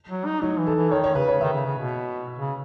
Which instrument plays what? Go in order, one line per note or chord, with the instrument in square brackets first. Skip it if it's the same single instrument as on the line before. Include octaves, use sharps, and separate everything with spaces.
[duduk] F#3
D#4
[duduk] F#3 [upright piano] D#4
[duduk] E3
[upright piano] A4
[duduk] E3
[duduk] D#3 [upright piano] C#5
[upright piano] C#5
[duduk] C#3 [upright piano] B4
[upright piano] C#5
[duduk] D#3 [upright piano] E5
[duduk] C#3
C#3
B2
C#3